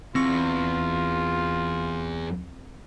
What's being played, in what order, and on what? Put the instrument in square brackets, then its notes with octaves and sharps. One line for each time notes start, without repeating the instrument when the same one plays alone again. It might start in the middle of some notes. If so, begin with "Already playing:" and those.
[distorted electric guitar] E2 [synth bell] C4 C#6 C#7 [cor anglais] F4